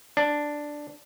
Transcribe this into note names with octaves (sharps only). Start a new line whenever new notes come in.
D4